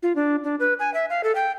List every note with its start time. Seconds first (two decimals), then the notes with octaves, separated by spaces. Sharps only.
0.03 F4
0.16 D4
0.44 D4
0.60 B4
0.79 G#5
0.94 E5
1.10 F5
1.24 A4
1.35 G5